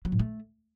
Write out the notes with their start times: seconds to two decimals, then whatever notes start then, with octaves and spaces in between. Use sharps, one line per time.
0.05 F#3
0.12 A2
0.19 A3